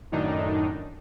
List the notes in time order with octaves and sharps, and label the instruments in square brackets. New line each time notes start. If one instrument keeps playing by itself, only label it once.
[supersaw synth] F#2 A2 D#3 D4 D#4